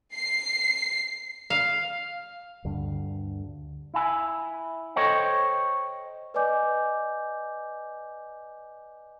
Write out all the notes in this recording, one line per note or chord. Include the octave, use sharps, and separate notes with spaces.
C7
F5
D2 G2 D3
E4 G#5
A4 C5 C#5 D#5 G5
B4 D5 D#5 G#5 D6 G6